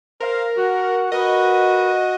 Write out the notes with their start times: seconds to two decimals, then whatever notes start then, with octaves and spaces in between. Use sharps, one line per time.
0.20 A#4 C5 F5
0.57 F#4 F#5
1.12 F#4 A#4 B4 D#5